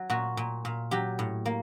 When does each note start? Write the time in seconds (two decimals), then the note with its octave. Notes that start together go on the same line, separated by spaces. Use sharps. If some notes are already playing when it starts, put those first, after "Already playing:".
Already playing: F#3
0.10 A#2 F#4
0.37 A#2
0.65 A#2
0.91 F#3 G4
1.19 A2
1.46 A#3